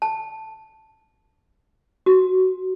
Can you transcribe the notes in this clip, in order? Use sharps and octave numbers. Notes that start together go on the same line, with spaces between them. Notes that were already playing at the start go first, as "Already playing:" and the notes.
A5
F#4